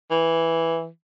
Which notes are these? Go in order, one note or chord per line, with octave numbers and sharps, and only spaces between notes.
E3